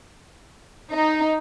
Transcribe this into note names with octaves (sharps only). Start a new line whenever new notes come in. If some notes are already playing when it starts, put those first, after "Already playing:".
D#4